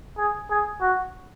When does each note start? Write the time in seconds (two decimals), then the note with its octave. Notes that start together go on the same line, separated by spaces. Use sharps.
0.18 G#4
0.50 G#4
0.81 F#4